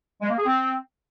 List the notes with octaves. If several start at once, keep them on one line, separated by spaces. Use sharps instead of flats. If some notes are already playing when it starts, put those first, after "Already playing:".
G#3
A#3
G#4
C4